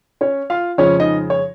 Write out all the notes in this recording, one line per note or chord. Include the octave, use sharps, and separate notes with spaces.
C#4 C#5
F4 F5
F2 C#3 F3 G#3 C#4 C#5
D#4 D#5
C#5